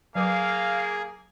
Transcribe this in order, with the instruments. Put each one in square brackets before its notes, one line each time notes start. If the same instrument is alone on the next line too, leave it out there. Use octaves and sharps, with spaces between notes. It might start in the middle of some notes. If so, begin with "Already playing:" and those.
[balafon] F#3 B4 D6 [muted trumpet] A#3 [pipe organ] G#4 [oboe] F5